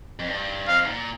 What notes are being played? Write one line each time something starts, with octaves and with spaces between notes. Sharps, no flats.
F2
G2
F2 F5
G#2
A#2